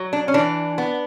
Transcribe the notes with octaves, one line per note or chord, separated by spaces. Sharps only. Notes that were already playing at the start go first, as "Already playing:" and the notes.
Already playing: F#3
D4
C#4
E3 D4
B3